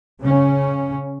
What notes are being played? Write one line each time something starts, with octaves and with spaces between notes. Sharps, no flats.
C#3 C#4